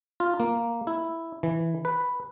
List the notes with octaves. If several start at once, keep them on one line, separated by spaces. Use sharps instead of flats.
F4
A#3
E4
E3
B4